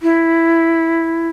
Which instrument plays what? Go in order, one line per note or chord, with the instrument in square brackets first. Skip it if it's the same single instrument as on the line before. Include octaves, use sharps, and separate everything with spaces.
[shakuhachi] E4